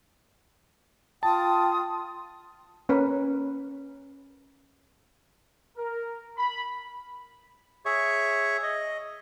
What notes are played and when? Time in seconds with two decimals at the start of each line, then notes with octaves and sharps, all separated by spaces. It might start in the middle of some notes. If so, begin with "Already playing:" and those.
1.23 F4 G5 A5 D#6
2.89 A#3 C#4 A#4 B4
5.77 A#4
6.38 B5
7.86 G#4 C#5 E5 C#6
8.63 D#5